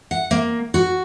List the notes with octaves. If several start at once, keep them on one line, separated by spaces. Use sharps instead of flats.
F#5
A#3
F#4